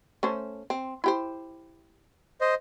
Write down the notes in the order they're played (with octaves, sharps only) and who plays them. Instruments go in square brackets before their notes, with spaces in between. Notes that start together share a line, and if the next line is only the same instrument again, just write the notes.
[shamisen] A3 C#4 C5
C4
E4 G4 C5
[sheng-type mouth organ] C5 D#5